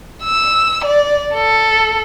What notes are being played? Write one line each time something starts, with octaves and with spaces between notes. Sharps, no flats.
E6
D5
A4